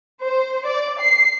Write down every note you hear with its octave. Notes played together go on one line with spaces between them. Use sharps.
C5
D5
C7